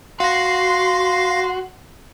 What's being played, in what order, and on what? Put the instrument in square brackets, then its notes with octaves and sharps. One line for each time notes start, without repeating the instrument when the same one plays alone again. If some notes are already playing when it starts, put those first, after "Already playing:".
[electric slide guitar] F#4 [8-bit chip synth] F5 A#6 [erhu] C6